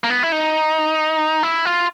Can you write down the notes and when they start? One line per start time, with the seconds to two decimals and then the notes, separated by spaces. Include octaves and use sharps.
0.04 A#3
0.10 B3
0.23 E4
0.32 D#4
1.43 E4
1.65 F4